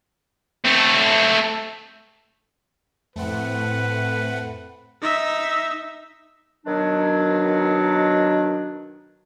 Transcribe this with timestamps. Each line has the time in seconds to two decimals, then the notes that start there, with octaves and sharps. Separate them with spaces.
0.64 A3 C4
3.16 F2 A2 A3 C4 B4 F#5
5.02 D#4 E5
6.66 B2 D#3 F#3 D4